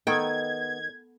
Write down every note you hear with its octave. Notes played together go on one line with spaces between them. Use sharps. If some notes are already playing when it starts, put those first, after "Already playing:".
D#3 B3 A4 G5 G#6